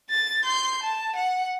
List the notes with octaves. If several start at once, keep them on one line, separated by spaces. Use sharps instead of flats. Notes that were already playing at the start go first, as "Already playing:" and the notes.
A6
C6 G6
A5
F#5